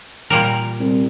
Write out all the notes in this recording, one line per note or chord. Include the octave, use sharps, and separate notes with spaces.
A#2 G3 A#4
C2